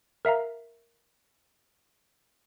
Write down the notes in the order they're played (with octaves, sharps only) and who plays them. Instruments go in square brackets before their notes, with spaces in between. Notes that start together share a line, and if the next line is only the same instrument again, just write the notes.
[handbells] A#4 E5 F5 A#5